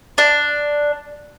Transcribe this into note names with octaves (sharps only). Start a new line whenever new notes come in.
D4